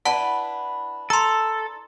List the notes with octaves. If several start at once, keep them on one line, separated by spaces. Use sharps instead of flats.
D4 E4 B4 F#5 A5
A4 A#5 C6